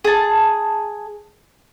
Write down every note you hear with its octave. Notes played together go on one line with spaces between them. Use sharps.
G#4 A5